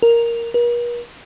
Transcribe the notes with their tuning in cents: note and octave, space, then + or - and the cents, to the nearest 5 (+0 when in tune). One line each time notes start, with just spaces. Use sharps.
A#4 +0
A#4 +45